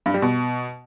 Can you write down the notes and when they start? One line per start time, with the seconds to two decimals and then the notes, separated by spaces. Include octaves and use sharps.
0.06 G2
0.14 G3
0.22 B2